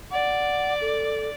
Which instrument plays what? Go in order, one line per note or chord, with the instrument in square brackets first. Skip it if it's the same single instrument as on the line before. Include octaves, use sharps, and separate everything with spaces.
[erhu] D5 [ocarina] F#5
[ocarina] A4